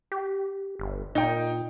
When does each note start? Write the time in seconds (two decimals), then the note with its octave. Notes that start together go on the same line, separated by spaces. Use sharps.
0.12 G4
0.79 G1
1.15 A#2 D#4 G5